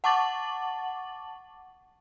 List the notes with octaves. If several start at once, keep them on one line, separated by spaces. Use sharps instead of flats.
F#5 A5 C#6 D6 A6 F#7